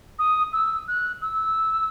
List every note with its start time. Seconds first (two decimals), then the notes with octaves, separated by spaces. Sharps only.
0.19 D#6
0.53 E6
0.88 F#6
1.22 E6